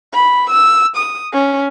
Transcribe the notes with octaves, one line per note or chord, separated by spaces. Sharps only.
B5
E6
D#6
C#4